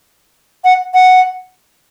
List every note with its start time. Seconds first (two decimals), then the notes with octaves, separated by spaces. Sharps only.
0.64 F#5
0.94 F#5